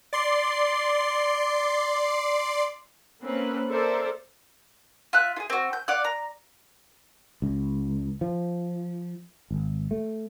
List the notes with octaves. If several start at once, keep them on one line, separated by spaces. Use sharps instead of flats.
D5 C6 C7
A#3 C4 C#4 B4
A4 A#4 C5 D5 E5
F4 E5 F#6
F4 G#4
C4 F#4
G6
D5 F5 F#5 F#6
A#5
C#2
F3
G#1
A3